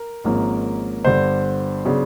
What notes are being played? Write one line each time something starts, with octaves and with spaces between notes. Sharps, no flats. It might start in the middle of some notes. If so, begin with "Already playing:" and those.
Already playing: A#4
G#1 G#2 F3 A#3 C#4
G1 G2 D3 C5
C#3 F#3 B3 D4